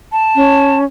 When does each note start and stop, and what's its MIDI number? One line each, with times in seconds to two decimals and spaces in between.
0.12 0.79 81
0.36 0.85 61